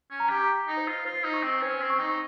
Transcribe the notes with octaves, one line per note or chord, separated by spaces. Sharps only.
C#4
A#5
G4
A#5
D#4
C5
F4
F4 C5
D#4
C#6
C4
C#4 C5
C4
C#6
D#4